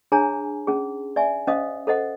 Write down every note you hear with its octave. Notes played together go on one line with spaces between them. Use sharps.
D4 G#4 C#5 G#5 A#5
C#4 G#4
D5 E5 G#5
C#4 C5 D#5 F5 D#6
A4 C5 D#5 F#5